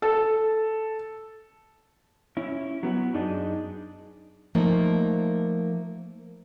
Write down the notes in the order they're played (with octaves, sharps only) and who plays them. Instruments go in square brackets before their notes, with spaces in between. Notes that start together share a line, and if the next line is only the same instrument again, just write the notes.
[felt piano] A4
[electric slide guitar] C#4 E4
F#3 B3 F#4
F#2 D4 D#4 G#4 D5 D#5
[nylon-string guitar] F3 A3 A#3 D#4